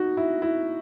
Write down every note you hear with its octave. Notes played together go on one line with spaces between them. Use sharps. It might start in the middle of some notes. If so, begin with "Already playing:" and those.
Already playing: D#4 F#4
E4
E4